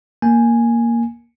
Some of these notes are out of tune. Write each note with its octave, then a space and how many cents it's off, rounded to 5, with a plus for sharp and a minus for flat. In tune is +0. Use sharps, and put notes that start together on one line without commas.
A#3 +0 G#5 +0